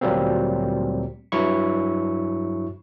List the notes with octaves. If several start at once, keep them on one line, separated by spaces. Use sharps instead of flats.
D2 A#2 F#3 G3 A#3 C4
G2 F#3 E4 C#6